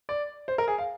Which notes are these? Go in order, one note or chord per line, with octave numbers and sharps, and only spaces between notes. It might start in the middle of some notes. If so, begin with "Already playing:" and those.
D5
C5
A#4
G#4
F5